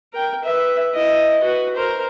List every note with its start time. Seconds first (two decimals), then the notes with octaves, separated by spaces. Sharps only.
0.13 A#4 G5
0.44 B4 E5
0.93 E4 D#5
1.42 F#4 B4
1.75 A#4 C5